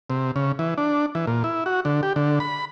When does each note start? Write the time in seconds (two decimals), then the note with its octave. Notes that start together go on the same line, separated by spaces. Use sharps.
0.10 C3
0.36 C#3
0.59 E3
0.78 D4
1.15 E3
1.27 A#2
1.44 E4
1.66 F#4
1.85 D3
2.03 G4
2.16 D3
2.40 B5